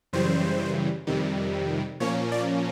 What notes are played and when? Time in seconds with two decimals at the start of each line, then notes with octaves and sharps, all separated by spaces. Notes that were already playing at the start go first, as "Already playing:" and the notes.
0.13 F#2 C#3 E3 G3 C5
1.07 F2 C3 D#3 G3
2.00 A#2 F3 A#3 C#4 C#5
2.32 D5